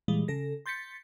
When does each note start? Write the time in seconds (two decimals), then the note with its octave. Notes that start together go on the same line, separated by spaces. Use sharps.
0.08 A#2 E3 G3 G#3
0.28 C#3 A4 A#6
0.66 C6 G6 A6 B6 C#7